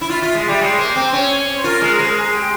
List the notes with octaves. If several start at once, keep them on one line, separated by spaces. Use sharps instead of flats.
E4
F4 E5
F4
G#3
G3
G#3 C#5
A#3 C5
C4 C5
C#4 C#5
C5
F4 A#4
G#3
G#3 C5
A#4
G#4
G4